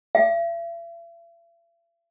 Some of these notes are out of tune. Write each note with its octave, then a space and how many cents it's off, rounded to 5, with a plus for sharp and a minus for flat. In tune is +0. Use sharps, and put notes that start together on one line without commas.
E5 +45